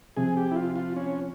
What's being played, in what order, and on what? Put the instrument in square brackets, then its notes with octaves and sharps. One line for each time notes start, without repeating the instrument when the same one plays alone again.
[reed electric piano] C3 F3 C4 [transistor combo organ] G#4
[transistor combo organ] G4
E4
F4
F4
C#4